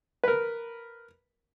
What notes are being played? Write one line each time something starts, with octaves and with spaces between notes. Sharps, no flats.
A#4 B4